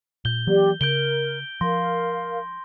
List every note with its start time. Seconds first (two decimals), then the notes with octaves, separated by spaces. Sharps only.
0.25 A#2 G6 G7
0.47 E3 F#3 A#3 G4 D5
0.81 C#3 A#4 G6 D7 G7
1.61 F3 A#4 F5 C6 A#6